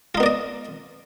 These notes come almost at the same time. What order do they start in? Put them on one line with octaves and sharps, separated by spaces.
F4 D#4 B3 D5 D#5